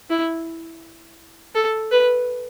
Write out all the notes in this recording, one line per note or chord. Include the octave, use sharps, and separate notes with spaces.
E4
A4
B4